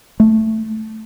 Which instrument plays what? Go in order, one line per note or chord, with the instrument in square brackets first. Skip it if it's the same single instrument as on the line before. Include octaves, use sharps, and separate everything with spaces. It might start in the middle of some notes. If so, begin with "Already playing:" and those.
[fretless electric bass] A3